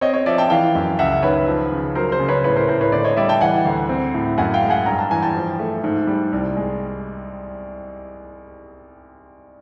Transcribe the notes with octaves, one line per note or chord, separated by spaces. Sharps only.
C4 C#5 D#5
C#5 D#5
F3 D5 E5
G5 A5
E3 F5 G5
F#2
C#2 E5 F#5
D#3 B4 C#5
F3
C#3
F#3 A#4 C5
A#4 C5
C#3
B4 C#5
A2 B4 C#5
A#4 C5
A2 A#4 C5
B4 C#5
D3 C5 D5
C#5 D#5
G3 D5 E5
G5 A5
E3 F#5 G#5
D2
C4
A2
F#2 F#5 G#5
F5 G5
G#3
F#5 G#5
G2 A#5
A5
E3 G#5
G5 A5
F3
A3
G#2
G3
C2
G#3